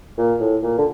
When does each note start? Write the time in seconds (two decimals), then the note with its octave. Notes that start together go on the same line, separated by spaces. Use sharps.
0.18 A#2
0.40 A2
0.63 A#2
0.78 D3